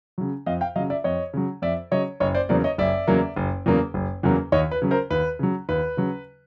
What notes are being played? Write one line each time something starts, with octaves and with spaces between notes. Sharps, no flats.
C#3 F#3
F2 D#5 F5
F5 G5
C#3 F#3 D#5 F5
D5 E5
F2 C#5 D#5
C#3 F#3
F2 D5 E5
C#3 F#3 C#5 D#5
F#1 C#5 D#5
C5 D5
E2 C#3 F#3 A#3 C5 D5
C#5 D#5
F#1 D5 E5
E2 C#3 F#3 A#3
F#1
E2 C#3 F#3 A#3
F#1
E2 C#3 F#3 A#3
D#2 C#5 D#5
B4
C#3 F#3
A#4 C5
D#2 B4
C#3 F#3
D#2 B4
C#3 F#3